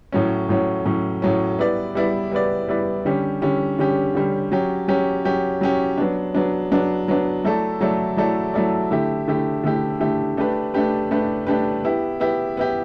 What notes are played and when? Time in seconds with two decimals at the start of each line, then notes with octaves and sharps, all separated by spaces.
0.12 A2 F#3 C#4
0.49 A2 F#3 C#4
0.85 A2 F#3 C#4
1.22 A2 F#3 C#4
1.59 G3 B3 E4 B4 D5
1.95 G3 B3 E4 B4 D5
2.31 G3 B3 E4 B4 D5
2.68 G3 B3 E4 B4 D5
3.05 D3 G3 C#4 G4
3.42 D3 G3 C#4 G4
3.79 D3 G3 C#4 G4
4.15 D3 G3 C#4 G4
4.52 F#3 C#4 G4
4.88 F#3 C#4 G4
5.25 F#3 C#4 G4
5.61 F#3 C#4 G4
5.98 F#3 B3 D4
6.35 F#3 B3 D4
6.71 F#3 B3 D4
7.08 F#3 B3 D4
7.44 F#3 A3 E4 A4 D5
7.81 F#3 A3 E4 A4 D5
8.17 F#3 A3 E4 A4 D5
8.54 F#3 A3 E4 A4 D5
8.91 D3 A3 E4 G4
9.28 D3 A3 E4 G4
9.64 D3 A3 E4 G4
10.00 D3 A3 E4 G4
10.37 A3 D4 G4 B4
10.74 A3 D4 G4 B4
11.11 A3 D4 G4 B4
11.47 A3 D4 G4 B4
11.84 B3 E4 G4
12.20 B3 E4 G4
12.57 B3 E4 G4